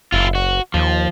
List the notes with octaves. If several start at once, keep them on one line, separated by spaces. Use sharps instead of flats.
F#1 E4 F4
F#4
D#2 F3